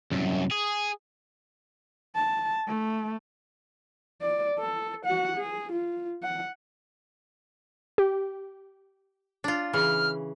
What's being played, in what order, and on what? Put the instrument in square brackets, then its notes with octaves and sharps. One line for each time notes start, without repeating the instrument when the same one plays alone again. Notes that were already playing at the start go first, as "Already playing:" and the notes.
[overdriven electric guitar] C2 F#2
G#4
[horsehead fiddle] A5
A3
D5
A4
F#4 F#5
G#4
F4
F#5
[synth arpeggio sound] G4
[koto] D4 F4
[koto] C#3 E3 [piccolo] F6